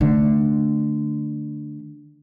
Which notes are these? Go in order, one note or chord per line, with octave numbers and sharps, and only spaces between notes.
D3 A3